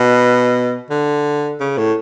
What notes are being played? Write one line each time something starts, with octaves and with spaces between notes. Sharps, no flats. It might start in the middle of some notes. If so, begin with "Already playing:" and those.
Already playing: B2
D3
C#3
A2